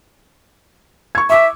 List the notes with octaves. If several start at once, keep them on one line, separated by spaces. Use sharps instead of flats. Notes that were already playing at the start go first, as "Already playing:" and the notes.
C#6 G#6
E5 C#6 D6 E6